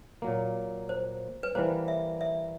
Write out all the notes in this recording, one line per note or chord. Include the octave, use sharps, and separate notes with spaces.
A#2 F#3 A#3
C5
B4
E3 G3 A#3 C5
E5
E5